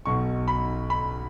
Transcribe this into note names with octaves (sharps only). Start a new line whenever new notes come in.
B1 B2 C#6
B5
B5